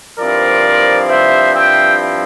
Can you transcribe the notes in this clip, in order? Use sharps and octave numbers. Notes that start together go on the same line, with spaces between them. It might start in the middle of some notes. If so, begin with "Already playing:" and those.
G2 F3 C4 E4 A#4 D5
C5 E5
E5 G5